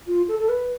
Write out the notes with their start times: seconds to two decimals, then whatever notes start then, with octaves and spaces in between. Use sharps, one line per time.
0.07 F4
0.28 A4
0.39 A4
0.49 B4